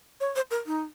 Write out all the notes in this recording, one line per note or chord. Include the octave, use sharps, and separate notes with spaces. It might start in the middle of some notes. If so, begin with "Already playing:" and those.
C#5
C5
A#4
D#4